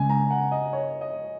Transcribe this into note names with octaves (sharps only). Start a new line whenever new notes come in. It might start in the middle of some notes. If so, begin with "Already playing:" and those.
Already playing: C#3 G#3 C#4 G#5
A#5
F#5
D#5
C#5
D#5